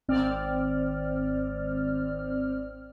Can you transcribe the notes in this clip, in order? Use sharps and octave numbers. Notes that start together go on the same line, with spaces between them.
G#1 C4 D5 F6